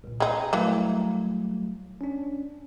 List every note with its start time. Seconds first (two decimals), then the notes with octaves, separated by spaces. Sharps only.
0.04 C2 A#2
0.20 G#3 D#4 G5 G#5 A#5
0.53 E3 F#3 G3 A3 A#3
2.01 C#4 D4